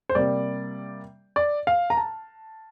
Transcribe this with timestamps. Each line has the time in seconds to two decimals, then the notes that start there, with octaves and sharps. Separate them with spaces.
0.09 C5
0.15 C3 G3 A#3 D5
1.36 D5
1.67 F5
1.90 A#5
1.97 A5